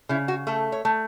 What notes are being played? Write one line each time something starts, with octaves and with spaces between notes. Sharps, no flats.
C#3 E4
F#4
A3 A4
C#5
A3